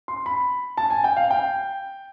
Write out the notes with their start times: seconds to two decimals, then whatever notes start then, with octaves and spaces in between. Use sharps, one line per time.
0.08 C6
0.26 B5
0.77 A5
0.90 G#5
1.04 G5
1.17 F5
1.31 G5